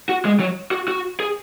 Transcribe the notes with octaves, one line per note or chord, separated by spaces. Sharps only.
F#4
G#3
F#3
F#4
F#4
G#4